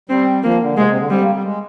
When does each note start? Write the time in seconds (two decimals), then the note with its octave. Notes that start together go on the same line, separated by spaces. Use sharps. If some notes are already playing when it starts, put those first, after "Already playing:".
0.09 G3 C4
0.43 F3 A#3
0.60 D3
0.76 C3 G#3
0.88 C3
0.99 D3
1.10 G3 C4
1.21 A#3
1.33 G3
1.44 G#3